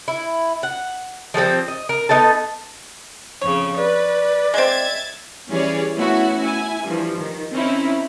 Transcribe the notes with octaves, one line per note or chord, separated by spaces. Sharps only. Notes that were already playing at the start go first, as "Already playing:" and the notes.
E4
F#5
F3 G3 G#3 C4
D#5
A#4
B3 D#4 A4 A5
F2 C#3 C#5
B4 D5
G#3 C4 E5 G#6 A6
E3 G3 C#4 G#4 C#5 D5
A3 B3 C#4 E4 F#4
E4 G#5
G2 E3 F3
D#3
C4 C#4 D#4 E4